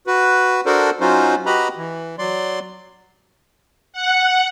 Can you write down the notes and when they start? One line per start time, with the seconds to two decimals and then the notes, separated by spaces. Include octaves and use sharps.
0.07 F#4 B4
0.66 D4 F#4 A4 A#4 C5 D5
1.01 F#3 C#4 D#4 F4 F#4 C5
1.46 F#4 G4 B4 D#5 A#5 B5
1.77 E3
2.19 F#3 D5 C6
3.93 F#5